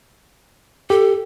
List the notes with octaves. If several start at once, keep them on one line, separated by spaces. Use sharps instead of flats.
G4 A4